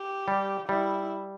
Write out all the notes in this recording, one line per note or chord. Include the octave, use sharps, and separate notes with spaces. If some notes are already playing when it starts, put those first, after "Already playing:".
Already playing: G4
G3
G3 E4